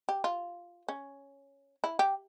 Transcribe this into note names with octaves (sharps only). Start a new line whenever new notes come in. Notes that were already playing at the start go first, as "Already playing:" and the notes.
G4
F4
C#4
E4
G4